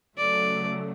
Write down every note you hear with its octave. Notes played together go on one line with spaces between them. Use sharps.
C#3 F#3 A3 D5